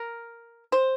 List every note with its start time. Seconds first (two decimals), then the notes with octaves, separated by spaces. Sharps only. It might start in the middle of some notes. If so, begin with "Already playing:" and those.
Already playing: A#4
0.72 C5